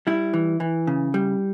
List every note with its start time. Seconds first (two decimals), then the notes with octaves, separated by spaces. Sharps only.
0.07 G3 E4
0.34 E3
0.60 E3
0.87 C#3
1.14 G3